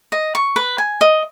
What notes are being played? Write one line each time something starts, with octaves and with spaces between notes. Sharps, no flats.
D#5
C#6
B4
G#5
D#5